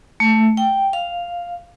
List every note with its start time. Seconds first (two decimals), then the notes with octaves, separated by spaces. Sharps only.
0.20 A3
0.57 G5
0.93 F5